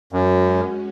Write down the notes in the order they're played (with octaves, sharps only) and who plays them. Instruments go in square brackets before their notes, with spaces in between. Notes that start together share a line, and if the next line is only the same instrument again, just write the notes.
[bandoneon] F#2 [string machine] G#3 C#4 F#4